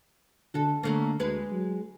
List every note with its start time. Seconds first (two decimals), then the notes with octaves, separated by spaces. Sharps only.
0.54 D3 F#4 A4
0.83 D3 F#3 A3 A#3
1.20 D2 G#3 G#4 B4
1.52 F#3